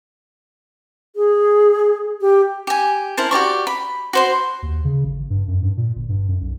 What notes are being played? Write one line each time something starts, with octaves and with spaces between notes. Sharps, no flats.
G#4
G4
G4 G#5
E4 A#4 C5 A5
F#4 G4 D5 C#6
B5
F#4 C5 C6
D#2
C#3
G#1
G2
F#2
G2
A#2
G1
G2
F#2
B1